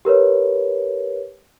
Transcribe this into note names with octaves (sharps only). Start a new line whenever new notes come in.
G4 A#4 B4 C#5